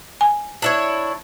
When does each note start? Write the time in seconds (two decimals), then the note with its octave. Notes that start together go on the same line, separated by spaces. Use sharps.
0.21 G#5
0.62 D4 E4 C#5